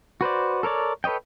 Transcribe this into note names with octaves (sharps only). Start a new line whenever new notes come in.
F#4 B4 C5 D5
A4 A#4 C#5 D5
A4 B4 C#5 D#5 G5